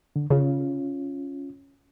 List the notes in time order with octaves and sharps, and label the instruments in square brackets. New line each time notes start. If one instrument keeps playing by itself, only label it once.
[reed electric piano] D3
[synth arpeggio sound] C#3 [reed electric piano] C#4 F4